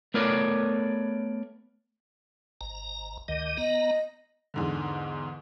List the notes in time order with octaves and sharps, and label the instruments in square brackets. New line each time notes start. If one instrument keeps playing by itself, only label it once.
[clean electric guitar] A3 B3 A#4 B4 C#5 D5
[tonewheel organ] G#1 A#5
D2 D#3 D#5
[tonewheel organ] B3 A#5 [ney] D#5
[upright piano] E2 G#2 D3